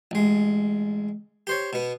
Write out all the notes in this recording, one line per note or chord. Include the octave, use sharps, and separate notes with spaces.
A1 G#3
G4 C5 C#5
B2 B3